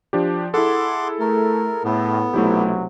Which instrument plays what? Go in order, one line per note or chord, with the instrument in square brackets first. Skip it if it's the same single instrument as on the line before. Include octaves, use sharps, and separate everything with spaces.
[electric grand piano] F3 D4 G4
[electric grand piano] E4 G#4 A4 [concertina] F#5 C6 D6
[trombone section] A3 [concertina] A#4
[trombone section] A2 [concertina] B3
[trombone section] B1 C3 F#3 [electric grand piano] A3 E4 G4